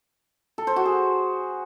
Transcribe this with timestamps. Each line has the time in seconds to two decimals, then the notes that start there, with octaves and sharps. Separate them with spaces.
0.58 A4
0.67 C5
0.76 F#4
0.85 G#4